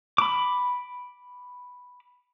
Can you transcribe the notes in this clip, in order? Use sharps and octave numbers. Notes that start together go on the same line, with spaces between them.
B5 D6